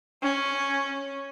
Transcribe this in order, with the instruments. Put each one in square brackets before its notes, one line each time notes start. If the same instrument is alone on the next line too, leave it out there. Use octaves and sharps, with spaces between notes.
[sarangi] C#4